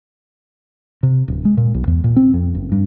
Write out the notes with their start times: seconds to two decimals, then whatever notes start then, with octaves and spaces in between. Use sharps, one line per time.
1.03 C3
1.28 D1
1.45 G#3
1.57 A#2
1.74 B1
1.87 E2
2.04 A#2
2.16 C4
2.34 F2
2.55 F#1
2.72 G2